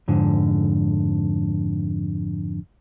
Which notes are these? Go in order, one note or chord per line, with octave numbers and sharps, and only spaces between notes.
F2 G#2 D3